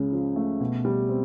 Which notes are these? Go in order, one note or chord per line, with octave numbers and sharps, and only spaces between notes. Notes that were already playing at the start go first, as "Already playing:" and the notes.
Already playing: C#2 C#3
F3
A3
B2
G3
C4